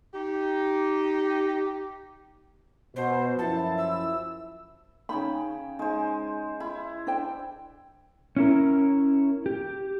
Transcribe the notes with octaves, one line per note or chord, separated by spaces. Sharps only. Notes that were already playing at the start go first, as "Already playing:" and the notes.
D#4 G4
B2 C5
F#2 F3 E4 A5
E6
C#3 C#4 D#4 G5 B5
G#3 D#4 C5
E4 B5
D4 C5 G5
C#4 E4 A#4
G4